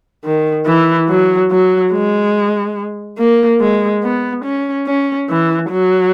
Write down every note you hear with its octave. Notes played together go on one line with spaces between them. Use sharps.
D#3
E3
F#3
F#3
G#3
A#3
G#3
B3
C#4
C#4
E3
F#3